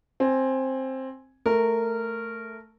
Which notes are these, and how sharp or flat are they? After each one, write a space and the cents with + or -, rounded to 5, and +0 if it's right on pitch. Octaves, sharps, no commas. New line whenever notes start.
C4 +10 G#5 +0
A3 +0 A#4 -15